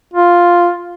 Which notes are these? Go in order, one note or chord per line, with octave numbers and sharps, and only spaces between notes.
F4